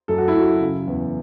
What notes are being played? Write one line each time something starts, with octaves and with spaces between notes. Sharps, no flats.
F#2 A4
F#4
E4
F#2 F#4
C#3
E2